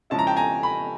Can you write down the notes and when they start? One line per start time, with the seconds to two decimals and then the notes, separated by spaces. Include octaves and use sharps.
0.10 C#3 F3 G#3 C#4 E4 A5
0.19 A#5
0.27 G5 A5
0.36 G#5 A#5
0.63 B5